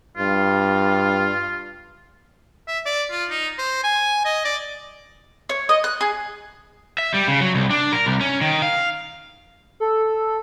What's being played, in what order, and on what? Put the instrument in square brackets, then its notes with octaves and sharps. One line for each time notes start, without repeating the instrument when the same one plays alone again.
[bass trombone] G2 [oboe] F4
[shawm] E5
D5
F4
D#4
C5
G#5
D#5
D5
[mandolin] C#5
D#5
F#6
G#4
[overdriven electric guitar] E5
G3
C#3
F#3
C2
D4
A#4
C2
C#4
D#3
F5
[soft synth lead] A4